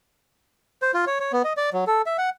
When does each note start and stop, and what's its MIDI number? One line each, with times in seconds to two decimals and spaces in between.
0.82 0.92 72
0.94 1.05 65
1.07 1.19 73
1.20 1.32 73
1.33 1.42 59
1.44 1.53 75
1.57 1.70 74
1.73 1.85 54
1.87 2.02 69
2.06 2.17 76
2.18 2.30 78